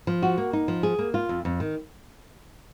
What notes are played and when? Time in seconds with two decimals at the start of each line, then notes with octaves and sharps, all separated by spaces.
0.07 F3
0.23 F#4
0.38 A#3
0.53 D#4
0.68 F3
0.83 G#4
0.99 A#3
1.14 F4
1.29 F2
1.45 F2
1.60 D#3